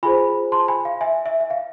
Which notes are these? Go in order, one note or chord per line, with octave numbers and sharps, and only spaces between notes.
F4 G#4 C5 G#5 B5
A5 C6
G#5 B5
F5
E5 G#5
E5
E5
F5